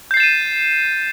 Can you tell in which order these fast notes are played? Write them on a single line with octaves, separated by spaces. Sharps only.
G6 C7 A6 E7 D#7